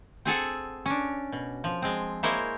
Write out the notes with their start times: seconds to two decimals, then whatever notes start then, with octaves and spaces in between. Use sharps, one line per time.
0.25 C4 G#4 A4 F#5
0.86 C#4 D4
1.32 B2
1.64 F3
1.82 G#3 C4
2.23 G#3 A#3 E4 A#4 C5 C#5